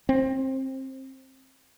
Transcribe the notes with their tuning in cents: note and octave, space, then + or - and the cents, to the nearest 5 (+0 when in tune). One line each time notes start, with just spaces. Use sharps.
C4 +25